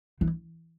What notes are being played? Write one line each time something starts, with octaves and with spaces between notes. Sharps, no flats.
E3